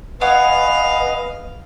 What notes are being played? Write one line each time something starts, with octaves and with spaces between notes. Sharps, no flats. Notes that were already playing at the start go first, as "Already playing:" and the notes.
B3 G#4 B4 C#5 D#5 F5